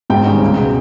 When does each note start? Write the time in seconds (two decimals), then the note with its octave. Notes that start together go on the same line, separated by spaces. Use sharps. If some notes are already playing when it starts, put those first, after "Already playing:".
0.10 G#2 G5
0.26 D#3 G3 C#4
0.41 C#2
0.57 B2 G#3